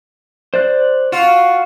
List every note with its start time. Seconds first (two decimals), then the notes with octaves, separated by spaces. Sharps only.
0.54 C5 D5 F#6
1.12 F4 F#4